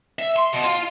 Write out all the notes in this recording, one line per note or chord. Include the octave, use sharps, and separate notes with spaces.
E5
C6
B2
F4